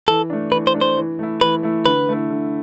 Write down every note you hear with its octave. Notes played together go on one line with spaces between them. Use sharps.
E3 A4
A3 D4
E3 B4
C5
A3 D4
C5
E3
A3 E4
E3 B4
A3 E4
D3 B4
A3 E4
D3